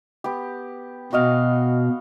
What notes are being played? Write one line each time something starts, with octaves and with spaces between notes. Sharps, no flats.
B3 G4
B2 F#4 D#5 F5